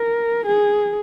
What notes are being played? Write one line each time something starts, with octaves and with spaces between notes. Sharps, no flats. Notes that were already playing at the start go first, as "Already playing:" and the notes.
Already playing: A#4
G#4